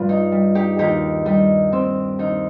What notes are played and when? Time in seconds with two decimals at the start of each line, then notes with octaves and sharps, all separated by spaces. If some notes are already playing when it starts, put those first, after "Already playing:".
Already playing: G2 F4
0.09 D#4
0.32 G3
0.55 D#4 G4
0.79 D#2 D#4 G4
1.25 G3 D#4
1.72 D#2 C4
2.19 D#2 D#4